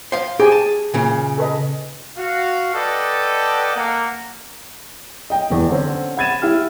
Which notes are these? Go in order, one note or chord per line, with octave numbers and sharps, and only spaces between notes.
C5 F5
G4 G#4 G#5
A5
A#2 C#3
A4 B4 D#5
F#4 F5
A4 B4 D5 D#5 F#5 G5
A#3 F#5
D#5 G5
F1 E2
D3 C4 C#4
F#5 B5 G#6 A6 D#7 E7
E4 G4 F6